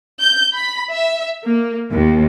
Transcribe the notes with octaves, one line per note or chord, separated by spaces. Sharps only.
G6
B5
E5
A#3
D#2